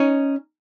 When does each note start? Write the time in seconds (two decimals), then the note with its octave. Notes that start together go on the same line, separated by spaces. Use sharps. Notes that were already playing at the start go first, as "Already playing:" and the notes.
Already playing: C#4 D#4